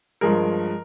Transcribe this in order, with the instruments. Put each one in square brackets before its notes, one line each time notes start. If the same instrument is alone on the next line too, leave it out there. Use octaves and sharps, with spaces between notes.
[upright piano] G2 F3 G#3 A#4